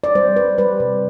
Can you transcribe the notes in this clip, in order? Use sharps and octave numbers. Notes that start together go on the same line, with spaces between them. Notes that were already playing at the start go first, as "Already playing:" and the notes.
D5
G3 C5
G3 B4
G3 B4
C3